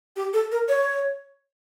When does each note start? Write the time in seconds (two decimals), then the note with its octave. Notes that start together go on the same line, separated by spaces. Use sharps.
0.16 G4
0.33 A4
0.52 A#4
0.69 C#5